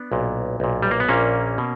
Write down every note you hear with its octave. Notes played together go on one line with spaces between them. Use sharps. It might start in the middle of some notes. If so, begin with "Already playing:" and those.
Already playing: B3 D4
B1 A#2
B1 A#2
G3
A#3
B3
A#1 A#2 A#3 C#4
B2